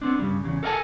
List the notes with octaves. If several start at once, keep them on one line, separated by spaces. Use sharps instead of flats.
B3 C4 D4
G2 C#3 G3
E2 C#3
A4 A#4 D5 F#5 G#5 A5